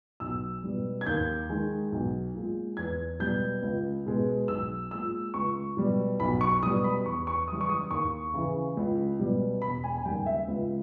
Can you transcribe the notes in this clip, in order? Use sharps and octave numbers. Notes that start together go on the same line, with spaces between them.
B1 E6
B2 G3
G#6
D#2 G6
D#3 G#3
B1
A#2 G#3
E2 G#6
B2 G3 G6
C#2
B2 G#3
B1 E6
A#2 G#3 E6
C#2 C#6
B2 G3
B1 B5
C#6
B2 G3 D#6
B5
E2 C#6
C#6
C#3 E3 G3 D#6
C#6
D#6
D#2 C#6
C#3 E3
C#2
B2 G3
E1 B5
G#5
G#5
D#2 C#3 G3 G5
E5
C#2